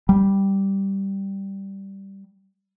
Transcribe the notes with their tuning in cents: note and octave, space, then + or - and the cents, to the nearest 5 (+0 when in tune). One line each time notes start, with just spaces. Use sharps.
G3 -5